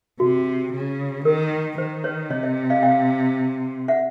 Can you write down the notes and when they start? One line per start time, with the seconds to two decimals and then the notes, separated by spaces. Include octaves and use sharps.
0.20 C3 F#4
0.73 C#3
1.25 D#3 A#4
1.78 D#3 C5
2.04 B4 C#5
2.30 C3 C#5 D#5
2.43 C#5 D#5
2.70 D#5 F5
2.83 F5 G5
3.88 E5 F#5